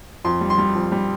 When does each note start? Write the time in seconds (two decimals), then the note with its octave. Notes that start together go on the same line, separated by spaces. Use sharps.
0.25 F2 C6
0.41 G3
0.50 C6
0.58 G3
0.75 F2
0.92 G3